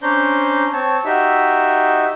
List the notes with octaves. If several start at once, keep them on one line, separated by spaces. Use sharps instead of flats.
C#4 D4 C5 A#5 G6
C4 C#5 A5
D#4 F#4 G4 E5 E6